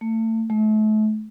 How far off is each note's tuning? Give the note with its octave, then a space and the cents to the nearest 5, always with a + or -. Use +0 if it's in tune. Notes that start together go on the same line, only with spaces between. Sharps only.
A3 +30
A3 -35